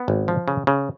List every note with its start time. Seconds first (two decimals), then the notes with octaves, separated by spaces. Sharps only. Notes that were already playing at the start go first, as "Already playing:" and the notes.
Already playing: B3
0.08 G#1
0.28 F3
0.48 C#3
0.67 C#3